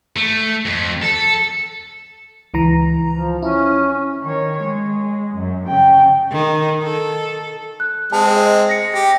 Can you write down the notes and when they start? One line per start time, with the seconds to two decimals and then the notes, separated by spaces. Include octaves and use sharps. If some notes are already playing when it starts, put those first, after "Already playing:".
0.16 A3
0.66 F2
1.03 A4
2.54 C#2 E3 A#5
3.15 F3
3.42 C#4 E4
4.21 D#3 C#5
4.62 G#3
5.35 F#2
5.66 C#3 G5
6.31 D#3
6.83 A4
7.80 F#6
8.13 G#3 C4 A5
8.36 D#5
8.69 A#6 C#7
8.94 G4 A#6